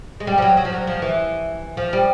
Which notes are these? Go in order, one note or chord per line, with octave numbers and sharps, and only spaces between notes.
G#3
G3
F3
F#3
F#3
F3
F#3
F3
E3
F3
G3